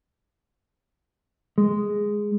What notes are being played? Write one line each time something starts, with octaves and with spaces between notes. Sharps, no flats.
G#3